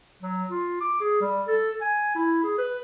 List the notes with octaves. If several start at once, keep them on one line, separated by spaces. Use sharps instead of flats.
F#3
F4
D6
G#4
G3
A4
G#5
E4
G#4
B4